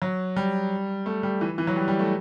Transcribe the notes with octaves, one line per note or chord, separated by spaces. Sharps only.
F#3
G3
A3
G3
E3
E3
F#3
G3
G3
A3